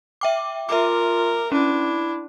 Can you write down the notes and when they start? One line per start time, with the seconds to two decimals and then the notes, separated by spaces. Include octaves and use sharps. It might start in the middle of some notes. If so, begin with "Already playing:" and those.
0.21 E5 G5 D6
0.69 F4 A#4 E5 D6
1.52 C#4 D4 E4